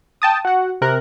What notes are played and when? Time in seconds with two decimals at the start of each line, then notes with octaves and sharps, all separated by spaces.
0.22 G5 A5 D#6
0.45 F#4 F#5
0.81 C3 A#4 F#6